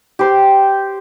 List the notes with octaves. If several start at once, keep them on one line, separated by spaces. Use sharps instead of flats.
G4 C5